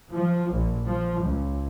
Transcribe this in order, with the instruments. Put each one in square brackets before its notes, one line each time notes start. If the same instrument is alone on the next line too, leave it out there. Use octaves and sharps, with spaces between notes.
[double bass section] F3
A#1
F3
C#2